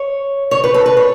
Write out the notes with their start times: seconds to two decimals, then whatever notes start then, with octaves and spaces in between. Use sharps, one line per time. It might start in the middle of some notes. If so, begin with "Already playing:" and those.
Already playing: C#5
0.51 C#5
0.64 B4
0.74 A4
0.86 B4
0.97 C#5